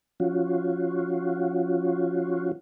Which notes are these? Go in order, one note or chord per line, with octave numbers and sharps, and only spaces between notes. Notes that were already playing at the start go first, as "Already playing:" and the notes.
F3 C#4 F4 F#4